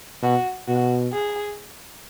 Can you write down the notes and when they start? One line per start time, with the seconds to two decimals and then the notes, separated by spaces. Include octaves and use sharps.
0.22 B2 F#4
0.68 B2 F#4
1.13 G#4